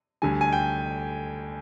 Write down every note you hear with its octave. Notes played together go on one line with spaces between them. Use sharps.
D2 D3 G3 G#5
G#5
G5